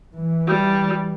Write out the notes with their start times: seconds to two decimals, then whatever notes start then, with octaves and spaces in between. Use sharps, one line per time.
0.16 E3
0.47 G3